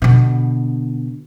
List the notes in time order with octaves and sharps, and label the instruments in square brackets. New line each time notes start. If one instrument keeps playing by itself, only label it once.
[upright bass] B2 D3